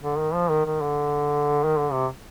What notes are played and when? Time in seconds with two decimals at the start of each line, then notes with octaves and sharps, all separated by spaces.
0.02 D3
0.18 D#3
0.34 F3
0.49 D#3
0.65 D#3
0.82 D3
1.64 D#3
1.79 D3
1.92 C3